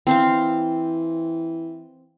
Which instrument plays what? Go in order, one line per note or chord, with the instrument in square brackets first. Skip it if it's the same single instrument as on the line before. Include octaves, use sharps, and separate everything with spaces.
[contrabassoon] E3 [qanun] C4 C5 F5